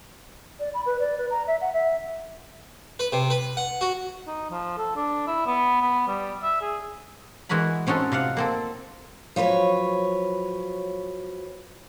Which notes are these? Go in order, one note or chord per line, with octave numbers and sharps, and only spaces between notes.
D5
B5
B4
D5
B4
A#5
E5
F#5
E5
B4
C3
B4
F#5
F#4
D#4
F3
A4
D4
E4
B3
B3
G3
E5
G#4
E3 G#3 F#4 A#4 B5
C4 C#4 D#4 F#4 A4
C3 F4 F5 F#5
A#3 C4 A4
F3 F#3 B4 C#5